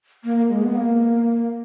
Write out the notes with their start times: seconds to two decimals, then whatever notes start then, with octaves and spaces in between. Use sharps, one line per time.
0.24 A#3
0.49 G#3
0.63 B3
0.75 A#3